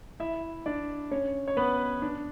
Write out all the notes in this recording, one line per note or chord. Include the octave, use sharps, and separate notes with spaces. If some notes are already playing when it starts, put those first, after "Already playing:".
E4 E5
D4 D5
C#4 C#5
C#5
B3 B4
D4